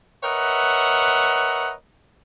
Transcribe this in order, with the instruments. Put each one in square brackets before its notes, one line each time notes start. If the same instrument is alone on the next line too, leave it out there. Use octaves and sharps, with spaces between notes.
[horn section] A#4 B4 C#5 D#5 E5 F#5